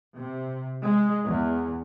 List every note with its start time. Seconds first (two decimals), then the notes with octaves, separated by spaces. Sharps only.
0.16 C3
0.82 G#3
1.27 E2